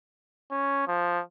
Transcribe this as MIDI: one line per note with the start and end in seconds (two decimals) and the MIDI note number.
0.51 0.85 61
0.88 1.21 53